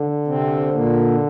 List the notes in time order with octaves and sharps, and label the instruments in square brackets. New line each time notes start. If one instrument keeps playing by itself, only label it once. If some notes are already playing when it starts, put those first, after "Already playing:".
Already playing: [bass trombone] D3
[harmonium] C3 C4
A#2 A#3